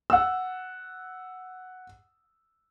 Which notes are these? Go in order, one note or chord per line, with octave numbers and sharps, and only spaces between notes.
F#5 E6